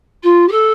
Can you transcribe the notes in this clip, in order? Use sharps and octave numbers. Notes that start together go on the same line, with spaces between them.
F4
G4
A4